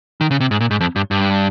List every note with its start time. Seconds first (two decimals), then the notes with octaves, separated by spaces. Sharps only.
0.21 D#3
0.31 C#3
0.41 C3
0.51 G#2
0.60 A#2
0.71 G#2
0.81 F2
0.96 G2
1.11 G2